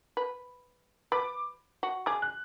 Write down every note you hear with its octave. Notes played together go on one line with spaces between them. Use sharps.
B4
B4 D6
F#4
G#4 D6
F#6